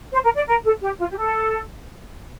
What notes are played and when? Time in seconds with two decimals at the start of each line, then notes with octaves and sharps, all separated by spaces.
0.12 C5
0.24 A#4
0.36 D5
0.48 A#4
0.64 A4
0.82 G4
0.99 F4
1.11 G4
1.17 A4